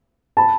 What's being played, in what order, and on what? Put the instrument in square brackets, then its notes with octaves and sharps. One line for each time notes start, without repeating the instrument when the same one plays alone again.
[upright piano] A5 B5